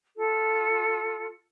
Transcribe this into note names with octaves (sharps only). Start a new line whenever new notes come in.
F4 A4